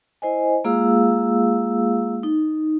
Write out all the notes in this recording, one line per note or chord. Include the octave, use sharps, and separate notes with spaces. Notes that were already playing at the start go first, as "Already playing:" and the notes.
E4 C5 D#5 G#5
G#3 A#3 F4 G#4 F5 E6
D#4